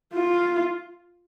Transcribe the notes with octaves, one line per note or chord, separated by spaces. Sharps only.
F4